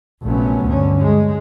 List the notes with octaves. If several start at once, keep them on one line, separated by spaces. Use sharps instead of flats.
A#1 C3 F#3 A3 B3 C#4
D2 G2 D3 C#4
G#3